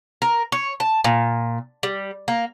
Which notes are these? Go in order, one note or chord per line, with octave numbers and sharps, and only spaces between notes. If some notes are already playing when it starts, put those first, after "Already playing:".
A#4
C#5
A5
A#2
G3
A#3